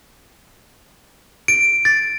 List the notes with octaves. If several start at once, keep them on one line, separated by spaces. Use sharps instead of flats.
D7
A6